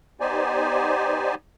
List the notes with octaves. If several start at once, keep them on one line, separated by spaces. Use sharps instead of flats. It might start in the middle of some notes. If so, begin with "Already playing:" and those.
B3 D#4 G4 C5 D5 G#5